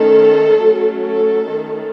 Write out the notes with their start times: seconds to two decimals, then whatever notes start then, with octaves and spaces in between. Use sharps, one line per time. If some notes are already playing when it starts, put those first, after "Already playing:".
Already playing: D#3 A3 C#4 A4
0.62 F#3 A3 C#4
1.04 A4
1.46 D#3 A3 C#4